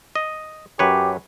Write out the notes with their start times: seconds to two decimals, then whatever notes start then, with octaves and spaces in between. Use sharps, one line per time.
0.15 D#5
0.79 F#2 G4 B4 C#5